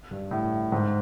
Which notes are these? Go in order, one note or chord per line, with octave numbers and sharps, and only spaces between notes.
G2
A2
G#2